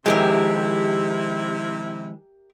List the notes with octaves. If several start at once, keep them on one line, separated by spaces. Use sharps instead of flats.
C3 D#3 F3 G#3 E4 G4 A#4 E5